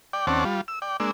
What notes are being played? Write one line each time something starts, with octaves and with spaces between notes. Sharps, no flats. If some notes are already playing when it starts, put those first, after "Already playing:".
D5 G5
D#2 C4 C#4 D5 F#5 A5
G3 F4
E6
D5 G5
G#3 A#3 D4 E6